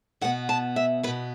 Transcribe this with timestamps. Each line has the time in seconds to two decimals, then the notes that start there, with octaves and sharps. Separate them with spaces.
0.21 B2 B3 F#5
0.49 A5
0.76 E5
1.03 B3 B4
1.07 B2